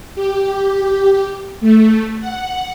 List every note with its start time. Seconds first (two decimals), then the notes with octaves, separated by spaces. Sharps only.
0.15 G4
1.61 A3
2.20 F#5